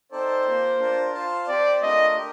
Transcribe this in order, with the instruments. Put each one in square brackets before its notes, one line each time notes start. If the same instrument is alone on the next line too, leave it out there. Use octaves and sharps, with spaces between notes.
[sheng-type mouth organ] C4 D#4 A4 D5 A5 [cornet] C5
[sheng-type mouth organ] A#3 F4 A#4
D4 F4 A#4
F4 C5 F5 A5
[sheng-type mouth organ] C4 G4 C5 [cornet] D5
[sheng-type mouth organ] A3 D4 F4 A#4 [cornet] D#5
[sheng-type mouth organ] G4 A#4